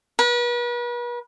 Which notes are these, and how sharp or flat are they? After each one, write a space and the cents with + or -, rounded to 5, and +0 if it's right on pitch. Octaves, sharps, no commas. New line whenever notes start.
B4 -40